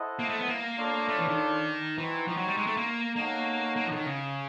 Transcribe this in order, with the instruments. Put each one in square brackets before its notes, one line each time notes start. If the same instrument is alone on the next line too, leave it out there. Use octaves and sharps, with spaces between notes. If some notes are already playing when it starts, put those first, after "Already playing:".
Already playing: [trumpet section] E4 A4 C5 D#5 F#5
[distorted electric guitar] A#3
A3
B3
A#3
[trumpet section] D4 F4 A4 C#5
[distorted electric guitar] A3
E3
D#3
[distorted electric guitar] E3 [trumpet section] C4 D#4 F#4
[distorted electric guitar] F3
F#3
G3
G#3
A3
A#3
[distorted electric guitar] A#3 [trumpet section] D#4 F#4 A4 C#5 F#5
[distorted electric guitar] A#3
F3
D3
D#3
C#3